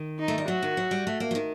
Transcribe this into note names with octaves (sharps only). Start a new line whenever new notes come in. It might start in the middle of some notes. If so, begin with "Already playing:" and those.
Already playing: D#3
D#4
A3
G3
F#3 F#4
D#3
F#3
G3
A3
A#3
F#3
D#3